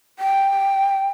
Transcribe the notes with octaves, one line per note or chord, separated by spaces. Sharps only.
G5